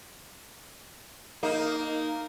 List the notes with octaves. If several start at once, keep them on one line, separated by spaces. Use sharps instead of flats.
A#3 D#4